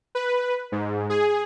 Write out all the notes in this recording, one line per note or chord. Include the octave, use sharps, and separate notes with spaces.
B4
G#2
G#4